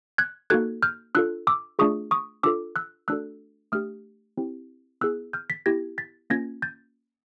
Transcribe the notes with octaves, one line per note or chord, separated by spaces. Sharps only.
F#6 G#6
A#3 D#4 F#4 A4 F#6 G#6
F6 G6
D4 F4 A4 E6 F#6
D6 E6
A3 D4 F4 G#4 C#6 D#6
C#6 D#6
D4 F4 A4 D6 E6
E6 F#6
A3 D4 F#4 A4 E6 F#6
A3 D4 G4 D#6 F6
C4 E4 G4
B3 E4 G#4 E6 F#6
F6 G6
A6 B6
B3 E4 G4 G#6 A#6
A6 B6
A#3 C#4 F4 G#6 A#6
G6 A6